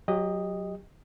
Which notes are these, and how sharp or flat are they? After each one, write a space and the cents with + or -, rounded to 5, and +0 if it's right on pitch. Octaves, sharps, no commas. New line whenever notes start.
F#3 +0 G4 +30 D#5 +0